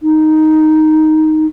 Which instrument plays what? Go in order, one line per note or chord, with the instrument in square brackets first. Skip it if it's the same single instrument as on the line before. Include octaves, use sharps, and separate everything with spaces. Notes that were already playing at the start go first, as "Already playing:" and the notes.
[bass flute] D#4